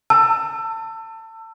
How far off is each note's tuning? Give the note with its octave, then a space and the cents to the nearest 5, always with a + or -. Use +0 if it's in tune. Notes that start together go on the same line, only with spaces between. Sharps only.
A5 +30 E6 +20